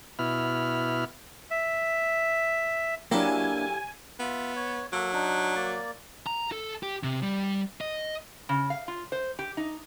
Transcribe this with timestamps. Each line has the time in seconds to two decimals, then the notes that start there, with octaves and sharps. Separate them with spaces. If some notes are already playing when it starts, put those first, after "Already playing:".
0.19 B2 E4 B5 F6
1.51 E5
3.11 F#3 A#3 D4 E4 G4 A4 F5 G#5
4.20 B3 F4 E5
4.56 C#5
4.93 F#3 A#3 A4
5.13 D4 D#4
5.56 A#3 D5
6.27 A#5
6.52 A4
6.83 G4
7.03 C3
7.23 G3
7.81 D#5
8.49 C#3
8.70 F5
8.88 F4
9.12 C5
9.39 G4
9.57 D#4